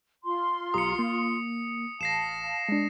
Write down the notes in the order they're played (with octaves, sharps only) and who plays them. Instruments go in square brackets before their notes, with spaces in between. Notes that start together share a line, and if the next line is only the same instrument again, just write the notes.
[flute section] F4 C6
[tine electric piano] B1 G4 A#5 [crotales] D#6 C#7
[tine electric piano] A#3
[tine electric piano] A1 [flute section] F5 A5 [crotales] A#6 C7 E7
[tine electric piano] G#3 D4